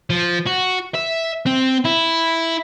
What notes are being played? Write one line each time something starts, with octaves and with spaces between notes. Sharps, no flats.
F3
F#4
E5
C4
E4